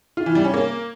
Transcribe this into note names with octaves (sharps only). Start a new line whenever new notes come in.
F4
E3
G3
C#4
A#3